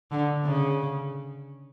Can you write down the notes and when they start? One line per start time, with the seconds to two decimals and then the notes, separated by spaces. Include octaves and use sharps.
0.11 D3
0.46 C#3